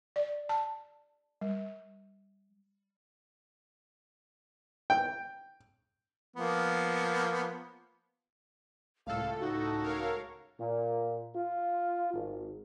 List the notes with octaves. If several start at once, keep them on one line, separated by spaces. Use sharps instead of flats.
D5
A5
G3
G5
F3 A#3 B3
C#2 A2 A4 F5
D#4 F#4
A#4 C#5 F5
A#2
F4
G#1